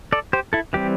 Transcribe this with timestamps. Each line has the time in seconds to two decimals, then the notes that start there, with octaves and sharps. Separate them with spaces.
0.12 A4 D5
0.33 G4 C5
0.53 E4 A4
0.73 E3 G3 C4 G4